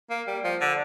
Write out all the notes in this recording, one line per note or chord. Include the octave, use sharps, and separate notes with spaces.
A#3
G3
F3
D3